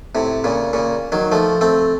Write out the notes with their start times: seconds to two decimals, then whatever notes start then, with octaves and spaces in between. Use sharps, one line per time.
0.15 A2 C3
0.44 A#2 C#3
0.73 A#2 C#3
1.12 D#3 F#3
1.32 F3 A3
1.61 A3 C4